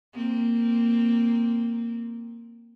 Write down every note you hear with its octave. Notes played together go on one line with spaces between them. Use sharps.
A#3 C4